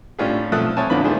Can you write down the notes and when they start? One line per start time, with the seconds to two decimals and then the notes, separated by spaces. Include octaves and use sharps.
0.19 A2 C#4 D4 F4 G4 G#4
0.52 B1 F3 A3 A4 D#6 F#6
0.77 C4 E4 C#5 G#5 A5
0.90 A#1 E2 D3 F3 B3 B5
1.04 D#3 G3 A3 G#4 C5